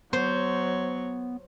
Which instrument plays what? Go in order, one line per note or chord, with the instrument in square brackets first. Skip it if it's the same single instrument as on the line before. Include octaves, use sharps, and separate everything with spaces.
[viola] F#3 C#5 [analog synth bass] B3 [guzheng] C5